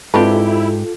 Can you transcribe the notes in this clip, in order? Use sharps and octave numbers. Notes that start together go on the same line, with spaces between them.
G#2 C4 D4 E4 F4 G4 A4 B4